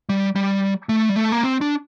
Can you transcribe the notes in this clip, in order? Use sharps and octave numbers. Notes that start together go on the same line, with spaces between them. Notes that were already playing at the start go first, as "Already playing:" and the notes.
G3
G3
A3
G3
A3
A#3
C4
D4